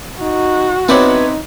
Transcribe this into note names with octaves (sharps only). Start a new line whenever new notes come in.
D#4 F#4
B3 C4 D#4 E4 B4 C#5 D5